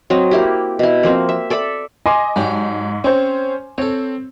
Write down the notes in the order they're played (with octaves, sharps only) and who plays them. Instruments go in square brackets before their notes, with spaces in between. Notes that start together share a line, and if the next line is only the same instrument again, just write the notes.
[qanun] F#3 C4 D#5
A#3 E4 G4
B2 E4
F3 A#3 C4
E5
A4 D5 E5 B5
[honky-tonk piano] D#5 [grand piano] G#5 C6 D6
[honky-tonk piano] G#2 [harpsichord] F#3 D4 G4
[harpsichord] C4 C#6 [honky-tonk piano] C#4 C5
[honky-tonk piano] C4 [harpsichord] A4 C#5